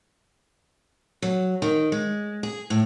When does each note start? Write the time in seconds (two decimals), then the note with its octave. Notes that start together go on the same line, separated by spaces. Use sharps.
1.22 F#3
1.62 D#3
1.92 G#3
2.43 G#4
2.70 A2